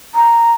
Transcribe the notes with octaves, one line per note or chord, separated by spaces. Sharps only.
A#5